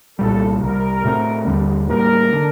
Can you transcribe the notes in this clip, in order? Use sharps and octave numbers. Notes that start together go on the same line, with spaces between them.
C2 A#2 G3 A4
C2 C3 G3 A#4
A2 A3 C4
D#2 D3 G3
A2 G3 A#3 A#4
D3 G3 D4